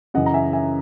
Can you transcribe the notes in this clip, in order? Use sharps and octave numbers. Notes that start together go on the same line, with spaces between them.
F#2 C#3 E3 D#5 F#5
A#5
E5 G#5
E5 G#5